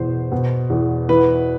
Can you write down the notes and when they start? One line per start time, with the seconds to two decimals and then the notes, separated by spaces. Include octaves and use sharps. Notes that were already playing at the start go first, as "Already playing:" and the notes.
Already playing: E2 B2 C5
0.32 B2
0.70 E2
1.09 E3 B4